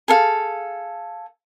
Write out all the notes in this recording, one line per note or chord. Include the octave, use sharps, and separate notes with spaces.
G#4 A4 F5